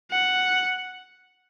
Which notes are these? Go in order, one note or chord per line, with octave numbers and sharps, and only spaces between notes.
F#5